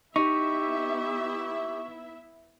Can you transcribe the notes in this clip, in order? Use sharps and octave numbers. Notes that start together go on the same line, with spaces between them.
B3 D#4 E4 G4 E5 C#6